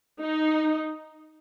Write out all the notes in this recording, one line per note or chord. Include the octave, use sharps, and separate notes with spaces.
D#4